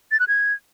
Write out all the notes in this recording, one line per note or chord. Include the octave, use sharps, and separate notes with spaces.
A6
F#6
G#6